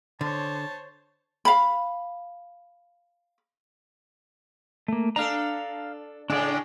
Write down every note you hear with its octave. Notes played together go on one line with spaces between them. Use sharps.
D3 C5 C#5 A5
F5 B5
A3 A#3
D4 A4 F5 A#5
A2 C#3 G#3 D4 D5